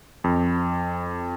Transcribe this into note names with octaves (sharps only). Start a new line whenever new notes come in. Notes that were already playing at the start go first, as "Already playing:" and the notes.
F2